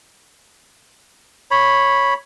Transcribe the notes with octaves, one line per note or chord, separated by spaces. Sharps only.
C#5 B5